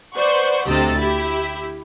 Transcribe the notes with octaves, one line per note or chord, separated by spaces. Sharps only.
B4 C5 D5 F#5 C#6
D2 C3 G4 D#5 E6 A6
E4 G4 E5